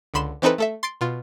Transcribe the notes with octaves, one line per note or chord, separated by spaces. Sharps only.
C#2 D3 B5 C6 E7
E3 C4 D#4 A4 B4
A3 A4 E5
C6 A6 C7 D7
B2 F4